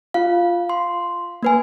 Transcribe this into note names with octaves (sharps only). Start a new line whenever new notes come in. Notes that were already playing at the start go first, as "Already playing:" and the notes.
F4 F5
C6
A#3 B4 G#5